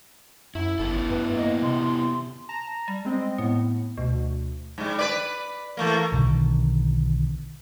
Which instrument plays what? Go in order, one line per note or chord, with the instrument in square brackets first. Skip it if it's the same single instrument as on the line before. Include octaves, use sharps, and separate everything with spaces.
[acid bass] F#2 [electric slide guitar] E4
[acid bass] G1 [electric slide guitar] B3 E4 A4
[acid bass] G2 [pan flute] B4
[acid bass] A#3 [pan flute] D#5
[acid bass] C3 [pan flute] C6
[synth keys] A5 A#5 A#6
[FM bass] G3
[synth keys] G#3 C4 D#5
[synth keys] A2 [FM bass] B3
[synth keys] D2 [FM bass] B2
[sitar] G#2 G3
B4 D5
E3 A3 A#3
[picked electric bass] B1 B2 D3 D#3